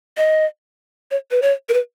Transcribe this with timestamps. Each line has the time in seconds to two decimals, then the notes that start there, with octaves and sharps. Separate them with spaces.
0.17 D#5
1.11 C#5
1.31 B4
1.42 C#5
1.69 A#4
1.74 B4